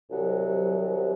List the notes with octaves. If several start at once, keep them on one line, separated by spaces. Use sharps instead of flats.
C2 C3 D#3 F#3